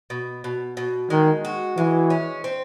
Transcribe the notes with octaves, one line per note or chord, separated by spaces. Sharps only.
B2
B2
B2
D#3 G#3
F#4
E3 G#3
C#4
C4